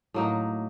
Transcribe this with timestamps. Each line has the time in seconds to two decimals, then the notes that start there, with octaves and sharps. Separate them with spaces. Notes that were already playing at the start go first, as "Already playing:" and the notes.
0.14 A2 F#3 A#3 D#4